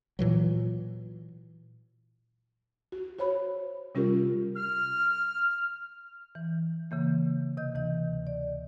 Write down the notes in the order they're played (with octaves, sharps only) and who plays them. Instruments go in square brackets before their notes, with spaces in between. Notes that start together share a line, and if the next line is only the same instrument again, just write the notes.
[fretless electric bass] A#2 E3 F#3
[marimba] F#4
F#4 C5 C#5 B5
C3 G3 C#4 F4 G4 A#4
[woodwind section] F6
[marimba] E3
C#3 E3 A#3
C3 D#5 G6
D2 E3 D#5
D5